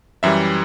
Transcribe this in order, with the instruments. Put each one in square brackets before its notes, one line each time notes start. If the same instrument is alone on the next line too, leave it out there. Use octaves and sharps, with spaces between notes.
[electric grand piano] F#2 E3 G3 E5